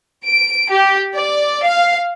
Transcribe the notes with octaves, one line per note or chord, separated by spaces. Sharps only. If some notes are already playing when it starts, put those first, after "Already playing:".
D7
G4
D5
F5